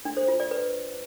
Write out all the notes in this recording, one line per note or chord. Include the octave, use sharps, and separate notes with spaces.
D4
C5
F4
D5
B4